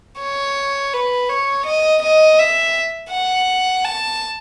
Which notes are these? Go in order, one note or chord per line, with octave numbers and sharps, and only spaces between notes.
C#5
B4
C#5
D#5
D#5
E5
F#5
A5